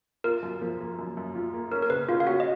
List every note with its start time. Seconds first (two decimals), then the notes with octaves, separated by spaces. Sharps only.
0.24 F4 A#4
0.43 F#2
0.61 F3
0.80 A#3
0.99 F#2
1.17 F#2
1.35 F4
1.54 A#3
1.72 C#4 A#4
1.82 A#4
1.90 C#3 B4
2.08 C#3 F4 F5
2.20 F5
2.27 C#4 F#4 F#5
2.40 D#5